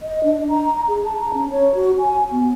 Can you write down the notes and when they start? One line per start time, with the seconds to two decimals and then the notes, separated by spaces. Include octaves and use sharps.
0.02 D#5
0.24 D4
0.49 A#5
0.88 G#4
1.05 A5
1.21 A#5
1.34 C#4
1.51 C#5
1.75 F#4
1.98 G#5
2.31 B3